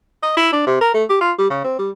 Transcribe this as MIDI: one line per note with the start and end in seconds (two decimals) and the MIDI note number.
0.23 0.32 75
0.37 0.52 64
0.53 0.66 62
0.67 0.78 48
0.81 0.91 70
0.94 1.04 57
1.10 1.18 67
1.21 1.32 65
1.38 1.49 55
1.50 1.64 49
1.64 1.75 60
1.79 1.90 55